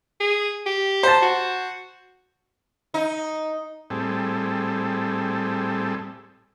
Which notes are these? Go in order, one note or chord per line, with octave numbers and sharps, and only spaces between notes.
G#4
G4
C5 A5
F#4
D#4
A2 G3 C4 G#4 A4